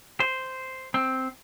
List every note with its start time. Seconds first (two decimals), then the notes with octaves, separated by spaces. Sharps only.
0.20 C5
0.94 C4